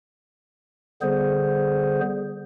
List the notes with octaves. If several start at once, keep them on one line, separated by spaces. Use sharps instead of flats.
D3 G3 B3 G#4 C5